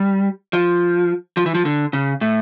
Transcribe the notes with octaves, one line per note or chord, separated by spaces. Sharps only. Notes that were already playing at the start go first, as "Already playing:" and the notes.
Already playing: G3
F3
F3
E3
F3
D3
C#3
A2